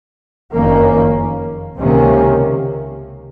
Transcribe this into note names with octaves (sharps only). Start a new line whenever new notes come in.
F#1 F2 D#3 A#3 C#4
C#2 C3 D#3 A#3 C#4